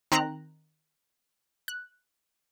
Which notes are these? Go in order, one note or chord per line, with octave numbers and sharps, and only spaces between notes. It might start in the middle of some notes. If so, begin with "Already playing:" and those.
D#3 C4 G5 A#5 F#6
F#6